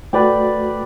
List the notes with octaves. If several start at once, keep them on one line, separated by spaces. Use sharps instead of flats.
A3 F#4 B4 D5 G5